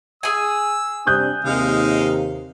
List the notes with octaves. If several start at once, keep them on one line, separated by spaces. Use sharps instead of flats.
G#4 G#5 E6
C3 G3 D4 D#6 F#6 G6
D#2 C3 G#3 D#4 F5